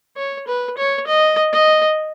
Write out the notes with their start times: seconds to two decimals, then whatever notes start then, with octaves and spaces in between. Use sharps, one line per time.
0.17 C#5
0.47 B4
0.77 C#5
1.07 D#5
1.52 D#5